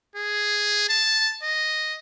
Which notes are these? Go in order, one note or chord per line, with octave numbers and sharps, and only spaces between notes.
G#4
A5
D#5